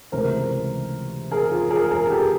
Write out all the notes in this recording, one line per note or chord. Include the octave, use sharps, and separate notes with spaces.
C#2 C3 E3 A3 A#4 C5
G#4 A#4
F4
G#4 A#4
G#4 A#4
G4 A4